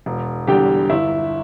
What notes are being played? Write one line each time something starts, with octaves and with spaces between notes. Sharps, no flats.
E1
E2 D3 G3 G4 G5
G1 E4 E5